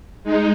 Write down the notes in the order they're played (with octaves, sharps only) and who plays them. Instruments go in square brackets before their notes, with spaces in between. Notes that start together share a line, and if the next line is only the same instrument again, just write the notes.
[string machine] G#3 D#4